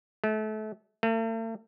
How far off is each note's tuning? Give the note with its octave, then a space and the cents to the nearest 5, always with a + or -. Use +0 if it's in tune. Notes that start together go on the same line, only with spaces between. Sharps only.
A3 -30
A3 +45